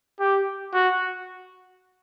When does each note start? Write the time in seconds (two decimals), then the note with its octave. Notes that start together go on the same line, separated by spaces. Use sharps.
0.20 G4
0.74 F#4